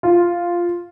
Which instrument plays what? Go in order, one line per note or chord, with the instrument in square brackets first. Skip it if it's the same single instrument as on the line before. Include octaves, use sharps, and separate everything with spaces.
[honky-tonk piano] F4